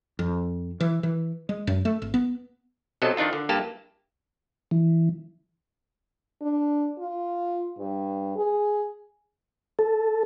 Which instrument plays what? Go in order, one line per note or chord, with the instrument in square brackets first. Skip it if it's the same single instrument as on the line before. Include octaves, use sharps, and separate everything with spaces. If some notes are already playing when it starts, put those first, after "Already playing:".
[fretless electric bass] F2
E3
E3
G#3
F#2
A3
G#1
B3
[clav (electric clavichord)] B1 C3 F#3 A4 D#5
D#3 D4 D#4 F4
D3
G2 A#3 G4 A5
[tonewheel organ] E3
[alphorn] D4
F4
G2
G#4
[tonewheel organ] A4